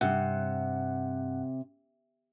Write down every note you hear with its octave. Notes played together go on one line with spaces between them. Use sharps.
G2 C3 F#5